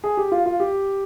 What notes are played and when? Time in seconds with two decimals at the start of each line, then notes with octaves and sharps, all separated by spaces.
0.04 G#4
0.17 G4
0.32 F4
0.46 F4
0.60 G4